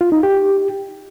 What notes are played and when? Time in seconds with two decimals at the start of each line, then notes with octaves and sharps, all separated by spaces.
0.01 F4
0.12 D#4
0.23 G4